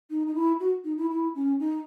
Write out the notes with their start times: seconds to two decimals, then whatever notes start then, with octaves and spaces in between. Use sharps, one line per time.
0.10 D#4
0.27 D#4
0.35 E4
0.60 F#4
0.85 D#4
0.98 E4
1.10 E4
1.35 C#4
1.60 D#4